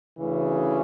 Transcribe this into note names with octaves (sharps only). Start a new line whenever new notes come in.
D2 C#3 E3